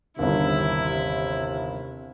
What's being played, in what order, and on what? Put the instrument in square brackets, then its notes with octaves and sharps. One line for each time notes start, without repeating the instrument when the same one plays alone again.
[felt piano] G1 D#2 [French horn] C3 [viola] E4